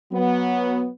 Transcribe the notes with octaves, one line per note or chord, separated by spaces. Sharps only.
F#3 B3